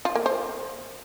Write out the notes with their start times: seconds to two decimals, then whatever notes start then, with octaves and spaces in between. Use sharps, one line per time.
0.05 F4
0.15 A#3
0.26 C5